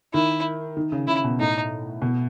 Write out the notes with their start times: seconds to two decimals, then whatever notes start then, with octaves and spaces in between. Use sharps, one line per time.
0.14 D#3 E4
0.77 D#3
0.92 C#3
1.07 C#3 E4
1.24 B2
1.40 A2 D#4
2.02 B2